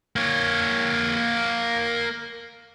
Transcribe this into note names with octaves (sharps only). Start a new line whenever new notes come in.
A#3 C#5